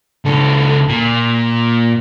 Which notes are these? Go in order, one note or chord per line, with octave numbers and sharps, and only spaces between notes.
C#2 A4
A#2